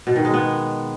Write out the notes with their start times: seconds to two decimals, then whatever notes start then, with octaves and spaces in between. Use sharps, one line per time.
0.07 B2
0.16 D#3
0.25 G#3
0.34 B3